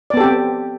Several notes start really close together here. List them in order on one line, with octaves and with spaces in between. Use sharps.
D5 B3 A4 G4 C4